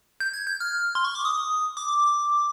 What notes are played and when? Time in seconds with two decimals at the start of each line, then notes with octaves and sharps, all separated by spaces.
0.20 G6
0.33 G#6
0.47 G6
0.60 F6
0.95 C6
1.05 C#6
1.15 D6
1.25 D#6
1.77 D6